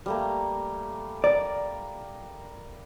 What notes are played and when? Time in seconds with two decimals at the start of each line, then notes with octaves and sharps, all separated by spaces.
0.06 G3 A3 A#3
1.24 A#4 D5